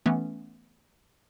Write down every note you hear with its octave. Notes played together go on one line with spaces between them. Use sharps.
E3 A3 B3 C#4